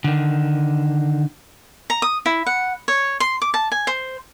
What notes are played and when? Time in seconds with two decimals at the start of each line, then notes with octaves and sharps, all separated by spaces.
0.04 D3 D#3
1.90 A#5
2.02 D#6
2.26 E4
2.47 F#5
2.88 C#5
3.20 C6
3.42 D6
3.54 A5
3.72 G#5
3.87 C5